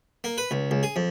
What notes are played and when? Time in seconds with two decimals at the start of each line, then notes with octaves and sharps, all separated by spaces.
0.24 A#3
0.38 B4
0.51 C#2
0.71 C#2
0.83 G#4
0.96 F2